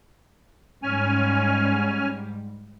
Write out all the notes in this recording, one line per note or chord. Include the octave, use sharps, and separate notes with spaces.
G#2 G3 C#4 G#5 F6